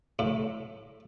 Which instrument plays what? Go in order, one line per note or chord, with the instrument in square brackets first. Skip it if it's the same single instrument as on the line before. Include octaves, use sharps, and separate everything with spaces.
[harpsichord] A2